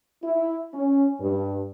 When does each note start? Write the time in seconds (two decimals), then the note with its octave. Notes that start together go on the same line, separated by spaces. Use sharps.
0.24 E4
0.74 C#4
1.21 G2